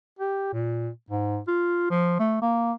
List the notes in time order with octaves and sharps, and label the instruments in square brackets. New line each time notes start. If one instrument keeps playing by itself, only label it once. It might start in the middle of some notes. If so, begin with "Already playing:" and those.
[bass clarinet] G4
A#2
G#2
F4
F3
A3
A#3